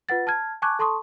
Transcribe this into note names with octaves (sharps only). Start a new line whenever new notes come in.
F4 B4 F#5 A6
A5 F6 G#6
G#5 A5 C#6 D6 F#6 G#6
A4 A5 C6 C#6 D#6